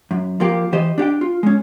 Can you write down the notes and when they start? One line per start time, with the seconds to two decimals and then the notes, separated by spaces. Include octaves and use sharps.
0.11 F#2
0.40 F3 A#3 G4
0.73 E3 G4 C5 D#5
0.98 D4 G4 F#5 G5
1.21 F4
1.43 G#3 C#4